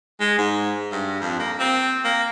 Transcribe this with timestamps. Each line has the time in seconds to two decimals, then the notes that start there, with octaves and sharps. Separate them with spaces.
0.20 G#3
0.38 G#2
0.92 G2
1.21 F2
1.39 A#3
1.59 C4
2.04 A#3